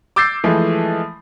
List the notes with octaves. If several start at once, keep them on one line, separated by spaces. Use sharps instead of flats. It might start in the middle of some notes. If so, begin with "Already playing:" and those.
D6 E6 G6 A6 C7
E3 F3 G#3 A3